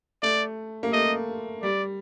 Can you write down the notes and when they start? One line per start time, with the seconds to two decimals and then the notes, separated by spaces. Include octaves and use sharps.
0.23 A3 D5
0.83 A#3
0.92 A3 D#5
1.62 G3 D5